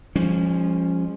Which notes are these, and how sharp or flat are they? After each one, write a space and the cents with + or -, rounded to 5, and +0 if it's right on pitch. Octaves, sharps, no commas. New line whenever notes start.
F3 +0 G#3 -40 C#4 +0